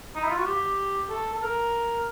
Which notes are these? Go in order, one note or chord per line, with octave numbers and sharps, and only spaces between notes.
D#4
E4
F4
F#4
G4
A4
A4
A#4